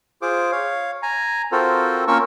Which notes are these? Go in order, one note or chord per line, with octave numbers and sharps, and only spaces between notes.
F4 G#4 C5 D6
C#5 F5
G#5 A#5
C4 F4 F#4 A4 A#4 C5
A#3 C#4 F4 A#4 C#6 E6